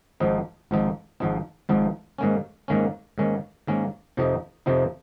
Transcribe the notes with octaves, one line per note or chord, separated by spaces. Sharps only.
G#1 G#2 F3 C4 D#4
G#1 G#2 F3 C4 D#4
G#1 G#2 F3 C4 D#4
G#1 G#2 F3 C4 D#4
G#2 D#3 A#3 C#4
G#2 D#3 A#3 C#4
G#2 D#3 A#3 C#4
G#2 D#3 A#3 C#4
F2 C3 F3 C4 D#4
F2 C3 F3 C4 D#4